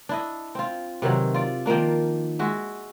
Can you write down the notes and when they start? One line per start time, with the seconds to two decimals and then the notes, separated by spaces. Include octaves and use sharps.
0.09 D4 E4 D#5
0.55 C4 F4
1.02 C3 D#3 E3 F#3
1.34 F4 D5
1.66 D#3 F3 A#3 D4
2.39 G#3 F#4 E5